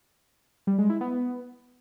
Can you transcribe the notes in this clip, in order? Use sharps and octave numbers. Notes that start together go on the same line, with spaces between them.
G3
G#3
E4
B3